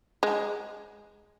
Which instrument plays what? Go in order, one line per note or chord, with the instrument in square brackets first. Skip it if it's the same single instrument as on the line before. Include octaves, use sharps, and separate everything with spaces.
[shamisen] G#3